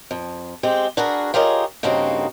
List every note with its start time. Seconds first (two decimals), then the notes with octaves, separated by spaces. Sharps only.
0.11 F2
0.63 G#3 C4 G4
0.97 D4 F#4 G#4 A#4 B4
1.34 F4 G4 G#4 A#4 C#5 D#5
1.83 G2 C#3 A#3 C4 D#4 F#4